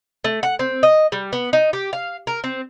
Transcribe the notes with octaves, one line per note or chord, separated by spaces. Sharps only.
A3
F#5
C4
D#5
G3
B3
D#4
G4
F5
A#4
C4